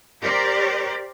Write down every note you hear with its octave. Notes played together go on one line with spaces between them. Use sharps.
G4 A#4 C5 D5